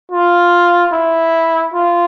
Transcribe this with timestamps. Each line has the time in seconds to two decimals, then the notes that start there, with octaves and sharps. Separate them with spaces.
0.12 F4
0.93 E4
1.74 F4